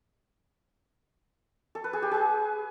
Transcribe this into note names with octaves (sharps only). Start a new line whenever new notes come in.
A4
B4
G#4
G4
G#4